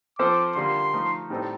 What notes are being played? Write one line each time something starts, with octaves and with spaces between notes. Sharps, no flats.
F3 C4 F4 A4 C5 D6
D3 G3 A#3 F4 C6
F3 A3 D#4
A2 G3 C4 D#4 A4